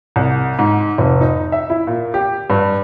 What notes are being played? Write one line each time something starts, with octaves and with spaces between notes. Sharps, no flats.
C2
G#2
F1
D#4
E5
E4
A#2
G4
G2